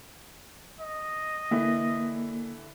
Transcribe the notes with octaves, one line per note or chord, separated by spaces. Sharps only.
D#5
D3 E3 A#3 E4